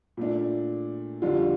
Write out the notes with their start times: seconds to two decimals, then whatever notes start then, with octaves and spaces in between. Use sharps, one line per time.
0.17 A#2 A3 D4
1.22 F2 D3 G3 D4 F4